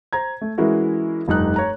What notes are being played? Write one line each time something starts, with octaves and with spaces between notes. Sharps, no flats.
C5 A#5 G#6
A3
E3 G#3 C#4 E4 F#4 A#4
F1 G2 D#4 F#6
C#5 A#5